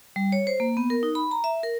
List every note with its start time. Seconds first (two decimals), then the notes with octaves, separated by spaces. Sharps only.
0.16 G3
0.32 C#5
0.47 C5
0.60 A#3
0.77 B3
0.90 A#4
1.03 D#4
1.15 B5
1.31 A#5
1.44 E5
1.63 A#4